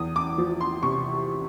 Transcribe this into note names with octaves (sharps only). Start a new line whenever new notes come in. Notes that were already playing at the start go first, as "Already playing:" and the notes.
Already playing: E2 D#6
D6
F3
C6
C3 C#6